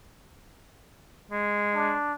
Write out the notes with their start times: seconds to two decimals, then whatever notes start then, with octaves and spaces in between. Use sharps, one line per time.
1.31 G#3
1.74 D4